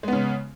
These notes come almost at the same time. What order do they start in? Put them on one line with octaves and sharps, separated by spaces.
G#3 B3 C#3